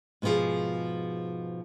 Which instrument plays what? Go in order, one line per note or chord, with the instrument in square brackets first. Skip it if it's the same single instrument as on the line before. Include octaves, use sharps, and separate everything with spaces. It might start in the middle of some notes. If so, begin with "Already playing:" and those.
[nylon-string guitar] G#2 B2 D3 F3 G#4